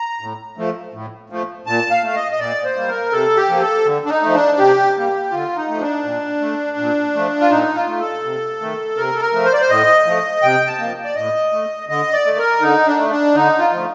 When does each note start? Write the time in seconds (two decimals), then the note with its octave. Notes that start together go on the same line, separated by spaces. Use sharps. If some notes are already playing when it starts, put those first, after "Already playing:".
Already playing: A#5
0.20 A2
0.57 F3 A3
0.93 A2
1.30 F3 A3
1.67 A#2 A5
1.91 F5
2.03 A3 F5
2.15 D#5
2.31 D#5
2.39 A#2 D5
2.64 C5
2.76 G3 A#3
2.88 A#4
3.12 C3 A4
3.37 G4
3.49 F3 A#3
3.61 A4
3.85 D3
4.05 D4
4.10 D#4
4.22 F3 A3
4.35 D4
4.59 C3 G4
4.95 G3 A#3
5.31 D3 F4
5.56 D#4
5.68 F3 A3
5.81 D4
6.04 A#2
6.41 A3
6.77 A#2
7.14 F3 A3
7.41 F4
7.50 A#2 D#4
7.75 F4
7.87 A3
8.00 A4
8.24 C3
8.60 D#3 A3
8.97 C3 A#4
9.15 A4
9.21 A#4
9.33 F3 A3
9.45 C5
9.53 D5
9.61 C5
9.70 A2 D#5
10.06 F3 A3
10.43 C3 G5
10.67 A5
10.79 F3 A#3
11.04 D5
11.15 A2 D#5
11.52 A3
11.89 D3 D#5
12.13 D5
12.25 A3
12.38 A#4
12.62 D3 D#4
12.87 D4
12.98 A3
13.10 D4
13.35 D3 D#4
13.59 F4
13.72 F3 A3